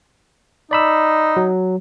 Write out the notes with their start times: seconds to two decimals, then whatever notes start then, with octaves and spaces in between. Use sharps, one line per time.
0.71 D#4 D5 B5 E6
1.37 F#3